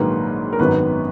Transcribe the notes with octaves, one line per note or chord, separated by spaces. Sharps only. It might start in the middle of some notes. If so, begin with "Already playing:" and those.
Already playing: A#1 G#2 D#3 F#3 A#3 B4
A#4
G#1 F#2 D#3 F#3 B3 B4